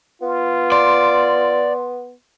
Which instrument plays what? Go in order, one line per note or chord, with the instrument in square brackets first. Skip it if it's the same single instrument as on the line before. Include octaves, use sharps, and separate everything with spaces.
[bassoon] B3 [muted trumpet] F4
[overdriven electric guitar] D5 [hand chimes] C6